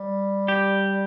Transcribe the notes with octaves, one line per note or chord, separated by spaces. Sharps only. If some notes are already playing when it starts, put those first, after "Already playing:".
Already playing: G3
G4